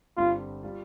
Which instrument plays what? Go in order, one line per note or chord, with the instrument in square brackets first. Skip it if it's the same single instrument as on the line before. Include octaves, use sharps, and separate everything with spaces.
[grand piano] G1 G2 G3 C4 [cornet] F4
[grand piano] G3 F4